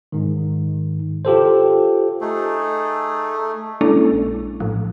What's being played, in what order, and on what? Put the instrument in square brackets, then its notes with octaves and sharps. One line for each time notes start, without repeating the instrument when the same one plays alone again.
[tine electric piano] G#2 D#3
F4 G4 A4 C5
[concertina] A3 [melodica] D#4 G#4 A4
[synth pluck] G#3 A#3 C#4 D4 E4 A4
A#1
A2 F3